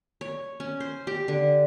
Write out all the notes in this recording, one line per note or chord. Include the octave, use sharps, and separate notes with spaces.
C#5
C#4
C5
G4
D3